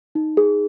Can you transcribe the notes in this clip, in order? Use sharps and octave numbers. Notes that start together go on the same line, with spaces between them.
D#4
G#4